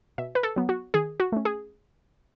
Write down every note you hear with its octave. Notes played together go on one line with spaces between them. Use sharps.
B2 E5
B4
A4
F#3 B3
F#4
D#3 G#4
F#4
A3 C#4
G#4